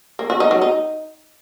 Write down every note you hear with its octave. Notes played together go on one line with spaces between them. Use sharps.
A#3
F#4
D#4
F#3
D#4